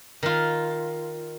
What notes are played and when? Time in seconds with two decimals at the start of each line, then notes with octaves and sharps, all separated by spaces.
0.23 D#3 F4